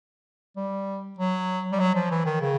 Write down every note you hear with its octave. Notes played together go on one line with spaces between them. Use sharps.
G3
F#3
G3
F#3
F3
E3
D#3
C#3